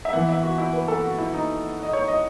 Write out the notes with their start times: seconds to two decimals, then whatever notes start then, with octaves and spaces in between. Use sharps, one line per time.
0.05 E5
0.13 E3 B3 F#5
0.29 E5
0.43 F#4
0.58 E4
0.73 B4
0.88 A4
1.04 F#4
1.18 E4
1.33 D#4
1.83 D#5
1.93 C#5
2.08 D#5